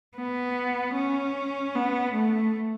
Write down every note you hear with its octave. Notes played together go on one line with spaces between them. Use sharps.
B3
C#4
B3
A3